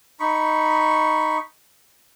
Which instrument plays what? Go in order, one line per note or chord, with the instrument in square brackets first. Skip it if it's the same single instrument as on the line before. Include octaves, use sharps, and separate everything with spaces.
[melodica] D#4 B5 C#6